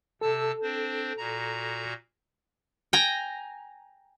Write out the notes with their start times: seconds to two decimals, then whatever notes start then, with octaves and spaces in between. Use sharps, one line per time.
0.21 C3 A4 A5 E6
0.62 C4 D4 C5
1.17 A#2 F#4 A#5
2.93 G5 G#5 A#5